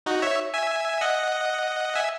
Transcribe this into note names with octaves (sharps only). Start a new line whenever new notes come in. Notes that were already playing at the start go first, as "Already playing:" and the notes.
D#4 F#4
C#5 E5
E5 G#5
D#5 F#5
E5 G#5